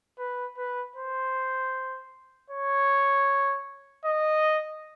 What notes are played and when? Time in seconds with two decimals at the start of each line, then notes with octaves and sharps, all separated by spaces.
0.19 B4
0.57 B4
0.96 C5
2.50 C#5
4.05 D#5